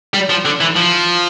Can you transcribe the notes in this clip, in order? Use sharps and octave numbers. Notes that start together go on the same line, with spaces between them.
G3
F3
D3
E3
F3